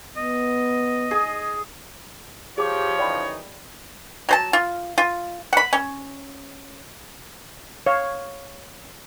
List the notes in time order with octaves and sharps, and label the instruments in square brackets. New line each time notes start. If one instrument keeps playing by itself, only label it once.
[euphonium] B3 [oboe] D#5
[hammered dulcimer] G#4
[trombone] F3 [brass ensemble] G4 [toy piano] G#4 D6 [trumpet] C#5
[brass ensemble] F#2 E3 D#4 [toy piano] D5 G5 B5
[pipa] F#3 C5 A5
F4
F4
F#5 B5
C#4
[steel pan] C#5 F5